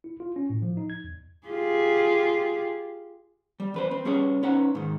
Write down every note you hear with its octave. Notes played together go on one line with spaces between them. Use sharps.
E4
F4
C#4
A2
F3
D#4
G#6
E2
F4 G4 G#4
G3
E2 B4 C5
C4
G3 C#4 G#4 B4 C#5
C#4 D#4 B4 F#5
G#2 D#3